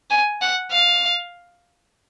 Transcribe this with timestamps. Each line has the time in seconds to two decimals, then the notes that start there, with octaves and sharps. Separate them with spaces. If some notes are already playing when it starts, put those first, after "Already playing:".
0.11 G#5
0.42 F#5
0.72 F5